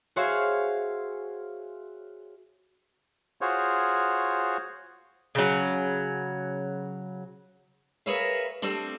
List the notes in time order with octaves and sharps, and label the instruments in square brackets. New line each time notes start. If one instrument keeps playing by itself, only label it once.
[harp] F#4 G#4 C5 C#5 E5 F5
[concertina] F4 F#4 G#4 C5 C#5
[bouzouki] C#3 F#3
[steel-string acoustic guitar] G#4 A#4 B4 C#5 E5 F5
G3 A3 C4 D4